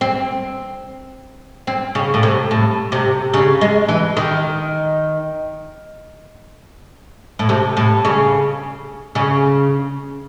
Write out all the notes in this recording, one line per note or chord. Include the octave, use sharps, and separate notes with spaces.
C4
C4
C#3
A2
C3
A2
C3
C#3
G#3
E3
D#3
A2
C3
A2
C#3
C#3